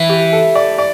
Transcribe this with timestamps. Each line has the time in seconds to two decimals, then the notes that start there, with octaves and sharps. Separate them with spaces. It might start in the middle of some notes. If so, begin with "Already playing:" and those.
Already playing: E3
0.10 G4
0.33 A4
0.55 D5
0.78 D5